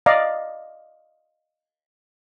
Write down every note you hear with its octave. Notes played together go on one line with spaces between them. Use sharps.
D5 D#5 F5 A#5